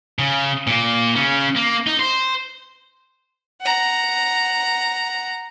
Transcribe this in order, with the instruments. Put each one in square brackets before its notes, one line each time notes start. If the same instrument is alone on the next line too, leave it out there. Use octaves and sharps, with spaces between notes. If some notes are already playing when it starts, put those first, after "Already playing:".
[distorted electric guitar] C#3
A#2 A#3
C#3 C#4
A#3
D#4
C5
[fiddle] F#5 A#5